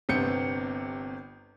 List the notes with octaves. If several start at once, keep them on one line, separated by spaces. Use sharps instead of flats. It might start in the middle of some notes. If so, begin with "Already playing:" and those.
G1 C3 B3 C4 G6 C#7